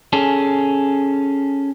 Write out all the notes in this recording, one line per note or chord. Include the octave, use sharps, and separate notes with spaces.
C#4 G#4 A4